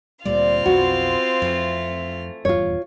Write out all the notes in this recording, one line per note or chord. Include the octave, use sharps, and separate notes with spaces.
D2 A#2 G3 C4 F4 D5 F5
B1 F2 F3 B3 F#4
F2 E3 A3
D#1 E2 G2 F4 C#5